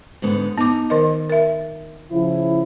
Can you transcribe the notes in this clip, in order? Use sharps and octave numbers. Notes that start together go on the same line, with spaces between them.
G#2 D3 B3
B3 D#4 D6
D#3 A#4 D#5
A#4 E5
C#3 F3 E4